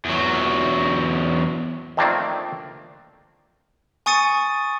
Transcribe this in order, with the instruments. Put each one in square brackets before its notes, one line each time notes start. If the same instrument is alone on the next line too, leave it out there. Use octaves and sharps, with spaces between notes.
[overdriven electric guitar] E2 F#3
[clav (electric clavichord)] D#3 F3 A3 A#3 C4 D4
[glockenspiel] G#5 C#6 D#6 A6 C#7 D#7